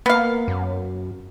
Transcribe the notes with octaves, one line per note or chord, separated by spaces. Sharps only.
A#3 B3 F5
F#2